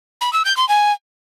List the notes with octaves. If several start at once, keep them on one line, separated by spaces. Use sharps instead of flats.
B5
E6
G6
C6
G#5